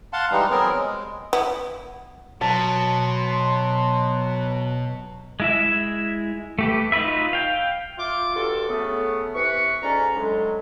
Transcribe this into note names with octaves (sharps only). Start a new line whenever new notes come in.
F5 F#5 A5 C6
E3 G3 G#3 D#4
F#3 B3 C4 G#4 A#4
G#3
B3 E4
B2 F#3 A5 C6
G#3 E4 E5
A3 G4 B4
D#4 F4 F#4 B4 E5
F5 G5
F4 E5 C6 D6
G2 F#4 A4
C#3 A3 B3
C3 E3 B4 C#6
D2 G#2 C#4 D5 A#5
A2 D3 F#3 G#3